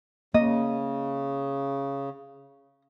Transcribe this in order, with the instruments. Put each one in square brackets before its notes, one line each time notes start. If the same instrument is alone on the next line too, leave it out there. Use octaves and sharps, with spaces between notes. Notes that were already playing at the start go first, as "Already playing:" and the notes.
[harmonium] C#3 [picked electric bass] A#3 [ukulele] D#5